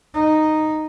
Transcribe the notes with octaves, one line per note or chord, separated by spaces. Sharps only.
D#4